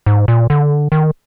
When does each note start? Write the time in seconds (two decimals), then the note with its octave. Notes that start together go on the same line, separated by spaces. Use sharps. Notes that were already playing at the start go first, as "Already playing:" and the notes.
0.06 G#2
0.28 A#2
0.50 D3
0.92 D#3